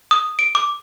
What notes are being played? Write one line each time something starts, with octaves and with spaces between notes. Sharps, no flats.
D#6
D7
D6